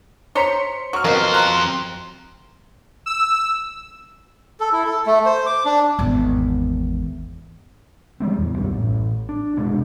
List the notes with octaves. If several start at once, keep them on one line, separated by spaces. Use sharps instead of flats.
C5 C#5 A#5 C6 B6 C#7
F#3 C#6 F6
F2 B2 A#3 C5
A#5 C6 F#6
E6
A4
E4
A4
A3
C5
D6
D4
G#1 E2
F3 G3 G#3 C4
A1 E2
C2 F#2 G3
A1
D4
F1 C3 G#3 D4